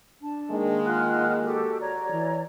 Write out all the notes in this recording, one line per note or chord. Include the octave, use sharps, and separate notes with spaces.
D4 A5
D#3 G#3 A#3
F4 F#5 F6 F#6
F#4 G4 A4
C#5 D5 A#5
E3